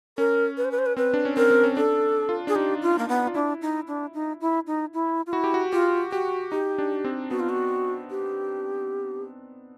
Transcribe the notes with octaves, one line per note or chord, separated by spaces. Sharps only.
C#4 A#4
B4
C5
B4
C5
B4
C4 B4
D4
C#4
C4 A#4
C4
C#4
D4 A4
F4
D4 G#4
D#4 G4
F4
A#3
B3
F4
D4 E4
D#4
D4
D#4
E4
D#4
E4
F4
E4 F#4
G4
F#4
F4 G4
F#4 G4
D#4 G4
D4
C4
B3 F#4
F4
F#4
G4